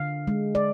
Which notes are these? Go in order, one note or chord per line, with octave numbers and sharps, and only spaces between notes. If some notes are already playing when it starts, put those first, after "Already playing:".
Already playing: D3 F5
G#3
D5